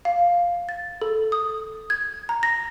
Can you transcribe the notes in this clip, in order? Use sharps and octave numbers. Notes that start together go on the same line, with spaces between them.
F5
A6
A4
D#6
G#6
A#5
A#6